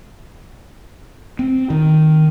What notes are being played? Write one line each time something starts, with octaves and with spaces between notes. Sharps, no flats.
C4
D#3